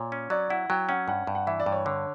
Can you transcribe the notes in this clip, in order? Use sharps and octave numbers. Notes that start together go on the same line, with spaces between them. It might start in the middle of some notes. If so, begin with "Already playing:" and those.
Already playing: A#2 C#5
C#4
F#3 D5
E4 F#5
F#3 G5
C#4 F#5
G2 F#5
G2
F#5
E3 E5
D5
G2
C#5
D3 C#5